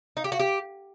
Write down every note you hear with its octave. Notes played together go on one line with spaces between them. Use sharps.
D#4
G4
F#4
G4